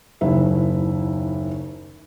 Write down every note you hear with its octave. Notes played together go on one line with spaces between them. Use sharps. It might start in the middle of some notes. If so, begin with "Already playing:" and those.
F#1 D#2 E4 E5